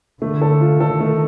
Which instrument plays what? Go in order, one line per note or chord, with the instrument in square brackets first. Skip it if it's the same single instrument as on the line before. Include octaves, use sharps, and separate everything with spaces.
[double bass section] D3 [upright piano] A3
[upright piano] A4
F4
[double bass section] D#3 [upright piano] A4
[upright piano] A3